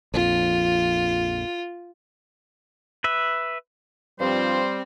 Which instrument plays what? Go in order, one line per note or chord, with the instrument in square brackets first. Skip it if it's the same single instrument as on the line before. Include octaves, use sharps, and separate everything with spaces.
[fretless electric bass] A#1 F2 [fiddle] F4
[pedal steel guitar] B4 E5
[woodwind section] G2 F3 [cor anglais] G3 [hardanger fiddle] C4 [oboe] C5